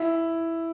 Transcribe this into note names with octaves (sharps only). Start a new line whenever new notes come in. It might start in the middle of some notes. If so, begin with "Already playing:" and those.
Already playing: E4